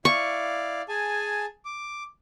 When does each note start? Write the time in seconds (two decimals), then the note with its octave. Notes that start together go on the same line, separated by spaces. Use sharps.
0.05 E4 D5 F5 C#6
0.88 G#4 G#5 A5
1.65 D6